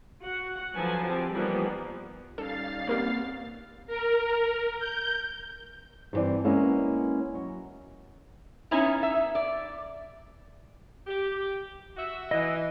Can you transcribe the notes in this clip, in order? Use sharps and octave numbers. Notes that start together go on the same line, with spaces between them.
F#4 F#5
D3 F3 F#3 B4 G#5 A5
C4 F4 G4
E3 F3 G3 A#3 B3 D#4
G3 C#4 D#4 A4 F5 A6 C7
A#3 C4 G4 A#4 C#5 F6
A#4
G6
G2 D3 E3 C4 D5
G#3 A#3 B3 C#4 E4
F#3
B3 C#4 D#4 E4
E5
D5
G4
F#4 E5
E3 D#5